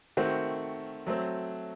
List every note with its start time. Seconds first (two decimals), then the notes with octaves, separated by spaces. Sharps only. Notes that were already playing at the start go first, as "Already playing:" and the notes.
0.17 D#3 A3 C4 F#4
1.07 F#3 A3 C4